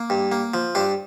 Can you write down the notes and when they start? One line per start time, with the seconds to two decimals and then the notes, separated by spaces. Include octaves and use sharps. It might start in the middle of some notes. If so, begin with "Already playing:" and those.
Already playing: A#3
0.10 G2
0.32 A#3
0.54 F3
0.75 G2 D4